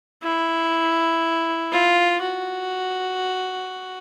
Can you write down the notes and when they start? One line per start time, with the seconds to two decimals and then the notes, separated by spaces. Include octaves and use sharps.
0.23 E4
1.72 F4
2.22 F#4